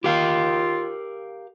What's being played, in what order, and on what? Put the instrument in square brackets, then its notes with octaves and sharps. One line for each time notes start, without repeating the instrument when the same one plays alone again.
[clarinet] F4 [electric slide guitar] G4 A#4 F5